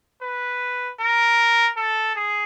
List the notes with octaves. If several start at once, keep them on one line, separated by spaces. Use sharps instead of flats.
B4
A#4
A4
G#4